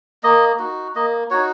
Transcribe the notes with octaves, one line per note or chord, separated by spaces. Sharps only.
A#3 D#5
D#4 F#4
A#3 D#5
D#4 F#4 C#5